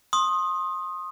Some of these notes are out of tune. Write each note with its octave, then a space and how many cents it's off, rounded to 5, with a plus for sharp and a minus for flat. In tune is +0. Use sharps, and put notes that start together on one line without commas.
C6 +25 D#6 +0